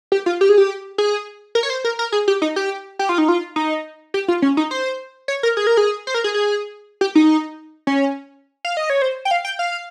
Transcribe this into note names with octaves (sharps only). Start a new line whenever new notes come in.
G4
F4
G4
G#4
G4
G#4
A#4
C#5
C5
A#4
A#4
G#4
G4
D#4
G4
G4
F4
D#4
F4
D#4
G4
F4
C#4
D#4
C5
C#5
A#4
G#4
A#4
G#4
C5
A#4
G#4
G#4
G4
D#4
C#4
F5
D#5
C#5
C5
G5
F5
G5
F5